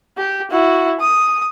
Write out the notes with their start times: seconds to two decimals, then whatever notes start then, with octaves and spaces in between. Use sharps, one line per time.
0.17 G4
0.51 E4 F#4
1.00 D#6